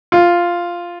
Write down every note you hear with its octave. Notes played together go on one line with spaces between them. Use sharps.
F4